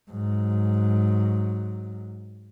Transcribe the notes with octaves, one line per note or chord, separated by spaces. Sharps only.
G#2 F#3